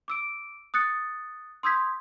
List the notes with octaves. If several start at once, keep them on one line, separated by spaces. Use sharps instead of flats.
D6 E6 D7
D#6 F#6 A6 C#7
C6 D#6 E6 G6 G#6 B6